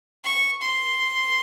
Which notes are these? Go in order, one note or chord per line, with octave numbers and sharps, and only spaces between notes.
C#6
C6